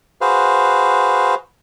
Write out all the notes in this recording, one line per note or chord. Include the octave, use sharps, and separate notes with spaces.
F#4 G#4 B4 C5 F5